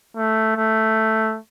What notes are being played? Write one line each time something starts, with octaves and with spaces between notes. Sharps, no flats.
A3
A3